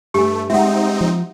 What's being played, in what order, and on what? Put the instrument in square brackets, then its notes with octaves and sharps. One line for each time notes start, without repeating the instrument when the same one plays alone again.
[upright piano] G2 [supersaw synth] A3 [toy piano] G4 G#5
[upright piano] G3 G#3 [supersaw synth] C4 D#4 [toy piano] E5 F#5
[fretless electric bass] F3